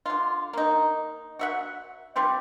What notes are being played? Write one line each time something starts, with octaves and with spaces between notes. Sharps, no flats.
D3 F4
A#3 D#4
F#4 E5 F#5
G3 C4 F4 G4